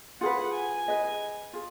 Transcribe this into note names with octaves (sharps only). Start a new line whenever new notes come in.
F4 G#4 B4 F#5
G#5
G#4 B4 D#5
F4 G#4